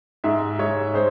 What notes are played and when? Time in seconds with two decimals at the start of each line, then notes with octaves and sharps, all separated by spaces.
0.24 G#2 E5
0.59 G#2 C#5
0.94 G#3 C5